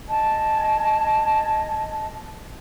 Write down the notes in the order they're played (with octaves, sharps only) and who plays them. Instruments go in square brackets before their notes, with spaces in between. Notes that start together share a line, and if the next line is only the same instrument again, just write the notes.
[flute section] D#5 G#5 A5